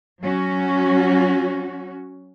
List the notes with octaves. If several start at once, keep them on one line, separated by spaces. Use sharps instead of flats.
F#3 C#4 F#4